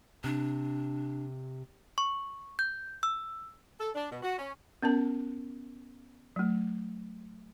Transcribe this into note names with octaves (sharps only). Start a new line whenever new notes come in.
C3 D4
C#6
G6
E6
A4
D4
B2
F#4
C#4
B3 C#4 A#4 A5
F#3 A3